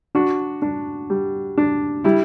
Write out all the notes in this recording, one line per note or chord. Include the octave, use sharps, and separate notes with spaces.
D4 F#4
D4
G3
D4
G3 E4